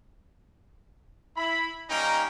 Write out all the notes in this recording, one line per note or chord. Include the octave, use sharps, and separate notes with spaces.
E4 B5
G3 A#3 C#4 D#4 G5 A#5